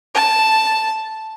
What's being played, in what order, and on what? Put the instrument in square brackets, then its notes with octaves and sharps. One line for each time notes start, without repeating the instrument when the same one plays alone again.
[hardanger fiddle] A5